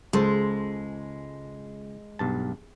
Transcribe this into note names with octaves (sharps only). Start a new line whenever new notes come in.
C#2 G#3 A4 C5
B1 G2 A5